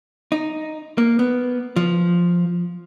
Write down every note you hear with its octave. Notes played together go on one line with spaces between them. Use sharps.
D#4
A#3
B3
F3